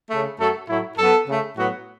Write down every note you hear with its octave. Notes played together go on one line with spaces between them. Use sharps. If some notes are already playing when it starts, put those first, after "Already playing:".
C#3 A3
F#2 F#3 A3 A4
A2 F#3 A3 E4
F#2 F#3 B3 A4
C#3 A3
A2 F#3 B3 F#4